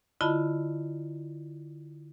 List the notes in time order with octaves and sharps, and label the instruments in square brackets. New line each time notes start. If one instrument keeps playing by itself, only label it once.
[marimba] D3 E4 F4 D#5 A5 B5